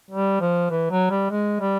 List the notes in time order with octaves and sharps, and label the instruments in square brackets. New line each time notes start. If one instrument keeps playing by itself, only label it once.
[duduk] G3
F3
E3
F#3
G3
G#3
G3